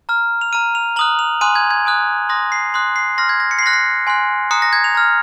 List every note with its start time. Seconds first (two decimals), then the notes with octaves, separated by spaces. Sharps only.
0.09 A#5 F6
0.41 F7
0.53 A#5 F6 D#7
0.75 F7
0.96 A#5 D#6 F#6 F#7
1.19 F7
1.41 G#5 C6 D#6 F#6 D#7
1.55 G#6
1.71 G#6
1.85 G#5 D#6 F#6
2.29 C6 D#6 F#6 A#6
2.52 C7
2.74 C6 D#6 F#6
2.96 C7
3.18 C6 F6 A#6
3.29 G#6
3.40 A#6
3.51 C#7
3.59 C7
3.62 C6 F#6 A#6
3.73 C7
4.07 G#5 C6 F#6
4.51 A#5 D#6 F#6 C#7
4.62 A#6
4.73 G#6
4.84 F7
4.95 A#5 F6